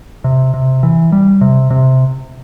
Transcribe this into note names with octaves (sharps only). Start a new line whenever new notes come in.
C3
C3
E3
G3
C3
C3